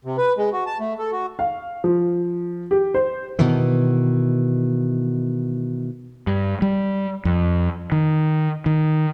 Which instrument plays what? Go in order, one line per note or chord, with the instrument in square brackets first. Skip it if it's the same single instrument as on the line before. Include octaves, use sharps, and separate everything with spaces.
[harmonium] C3
B4
G#3
F#4
A5
A3
A4
F#4
[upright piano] F5
F3
G4
C5
[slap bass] B2 D#3 E3
[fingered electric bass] G2
G3
F2
D#3
D#3